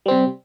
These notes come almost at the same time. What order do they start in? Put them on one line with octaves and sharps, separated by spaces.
G3 C4 C3